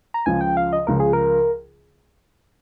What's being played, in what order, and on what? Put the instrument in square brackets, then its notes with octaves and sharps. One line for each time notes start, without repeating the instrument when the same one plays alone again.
[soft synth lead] A#5
[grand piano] C#2 C#3 F3 [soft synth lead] G#5
[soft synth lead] G5
F5
D#5
[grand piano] C#2 C#3 F3 [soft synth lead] A#4
[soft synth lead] G#4
A#4